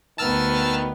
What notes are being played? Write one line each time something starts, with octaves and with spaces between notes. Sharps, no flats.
D2 D#3 B3 A5 E6 F6